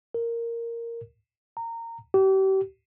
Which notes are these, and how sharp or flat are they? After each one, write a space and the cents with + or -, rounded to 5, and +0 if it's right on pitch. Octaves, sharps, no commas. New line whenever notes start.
A#4 -5
A#5 -20
G4 -35